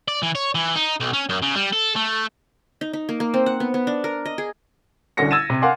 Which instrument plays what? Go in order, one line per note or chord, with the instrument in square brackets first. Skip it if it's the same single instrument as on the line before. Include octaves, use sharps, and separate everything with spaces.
[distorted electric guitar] D5
E3
C#5
E3
D#4
B1
C#4
F#2
C#3
G3
A4
A3
[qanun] D#4
D#4
A#3
A#3
C4
F#5
B3
B3
D4
A#4
D#5
G#4
[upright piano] C2 D3 C#4 F#4 A#6 C#7
E6 G#6 A6 D#7 E7
C3
A#4 F5 F#5 G#5 C6 D6